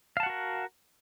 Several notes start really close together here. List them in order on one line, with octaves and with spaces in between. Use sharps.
F5 A5 F#5 F#4 A#4